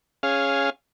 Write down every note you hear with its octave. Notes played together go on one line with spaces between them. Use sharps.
C#4 G#4 F5